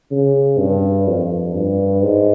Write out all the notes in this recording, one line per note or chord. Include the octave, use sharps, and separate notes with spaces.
C#3
G2
F2
G2
G#2